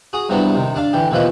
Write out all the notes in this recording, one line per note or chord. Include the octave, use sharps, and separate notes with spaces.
F#4 G#4 D#6
G2 C3 F#3 B3 D4 E4
C3 D#3
D4 D5 F5
D3 E3 G4
D#2 B2 E3 F3 F4 B4